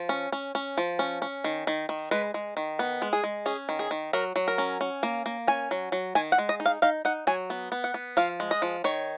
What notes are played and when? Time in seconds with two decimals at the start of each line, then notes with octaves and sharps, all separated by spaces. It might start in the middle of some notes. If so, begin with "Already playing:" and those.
Already playing: F3
0.09 C#4
0.32 C#4
0.55 C#4
0.78 F3
0.99 C#4
1.22 C#4
1.44 D#3
1.67 D#3
1.89 D#3
2.11 G#3 B4
2.34 G#3
2.57 D#3
2.79 B3
3.02 G#3
3.13 G#4
3.24 G#3
3.46 C#4 G#4
3.69 D#3
3.79 G#4
3.91 D#3
4.13 F#3 A#4
4.36 F#3
4.48 A#4
4.58 C#4
4.81 C#4
5.03 A#3
5.26 A#3
5.47 C#4 G#5
5.71 F#3
5.92 F#3
6.15 D#3 G#5
6.32 F#5
6.38 G#3
6.49 D#5
6.60 D#4
6.66 F5
6.82 D#4 F5
7.05 D#4 F#5
7.27 F#3 G#5
7.50 B3
7.72 B3
7.84 F#5
7.94 B3
8.17 F3 F5
8.40 G#3
8.51 D#5
8.62 F3
8.84 D#3 C#5